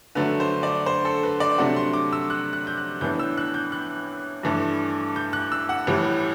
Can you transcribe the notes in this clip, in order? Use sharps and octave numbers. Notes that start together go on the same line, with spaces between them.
D3 F#3 A3 D4 B4
C5
D5
C5
A4
B4
D5
C3 F#3 A3 D4 F#5
C6
D6
E6
F#6
F#6
G6
F#6
A2 E3 B3 D4 G6
E6
F#6
G6
F#6
G2 E3 A3 D4
G6
F#6
E6
F#5
A2 E3 G3